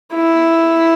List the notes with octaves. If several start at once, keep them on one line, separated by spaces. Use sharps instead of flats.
E4